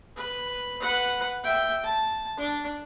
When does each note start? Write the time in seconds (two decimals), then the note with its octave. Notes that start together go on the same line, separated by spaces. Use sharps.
0.16 B4
0.81 B4 F#5
1.44 E5 G5
1.84 A5
2.37 D4